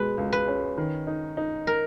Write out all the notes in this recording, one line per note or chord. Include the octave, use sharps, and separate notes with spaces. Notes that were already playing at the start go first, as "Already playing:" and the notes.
Already playing: B2 G#3 B4
C#2
B4
C#4
D#3
D#4
D#4
A#4